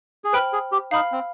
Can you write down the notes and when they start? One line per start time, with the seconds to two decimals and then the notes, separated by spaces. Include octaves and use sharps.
0.24 G#4
0.33 B4 C5 G5 B5 F6
0.53 G#4
0.72 G4
0.91 D#4 F5 B5 F6
1.12 C4